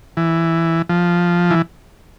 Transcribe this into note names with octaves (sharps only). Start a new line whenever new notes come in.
E3
F3
E3